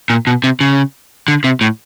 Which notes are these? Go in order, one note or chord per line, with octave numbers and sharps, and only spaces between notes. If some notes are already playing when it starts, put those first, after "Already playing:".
A#2
B2
C3
C#3
D3
C3
A2